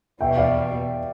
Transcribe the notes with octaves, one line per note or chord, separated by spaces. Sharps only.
E2 B2 G3 E5 G5
D5 F5